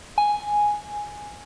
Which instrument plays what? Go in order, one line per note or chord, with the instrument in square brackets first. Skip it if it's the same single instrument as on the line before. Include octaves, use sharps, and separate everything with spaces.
[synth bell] G#5